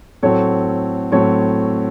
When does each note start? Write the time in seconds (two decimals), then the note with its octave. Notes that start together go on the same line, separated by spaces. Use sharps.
0.23 A2 F#3 A3 C4 A4 C#5
1.12 A2 F#3 A3 C4 A4 C#5